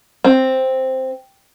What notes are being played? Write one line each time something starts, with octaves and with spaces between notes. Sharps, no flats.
C4